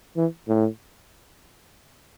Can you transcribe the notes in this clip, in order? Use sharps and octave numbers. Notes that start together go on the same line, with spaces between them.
E3
A2